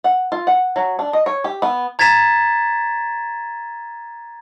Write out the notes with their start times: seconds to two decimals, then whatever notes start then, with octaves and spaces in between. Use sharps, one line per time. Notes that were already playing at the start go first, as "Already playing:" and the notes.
0.04 F#5
0.32 F4
0.47 F#5
0.76 F#3
0.99 D4
1.13 D#5
1.26 C#5
1.44 G4
1.62 B3
1.99 A#5 G#6 A6 B6 E7